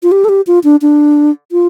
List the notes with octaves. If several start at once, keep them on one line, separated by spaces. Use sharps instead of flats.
F4
G4
A4
G4
F4
D4
D4
F4